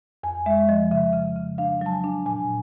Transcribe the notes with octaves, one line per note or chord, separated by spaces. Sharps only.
F2 G#5
G#3 E5
F3 D#5
C#3 E5
C#3
C#3
D4 F5
F#3 A5
G#5
D4
A#2 G#5